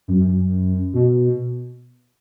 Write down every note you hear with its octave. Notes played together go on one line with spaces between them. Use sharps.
F#2
F#2
B2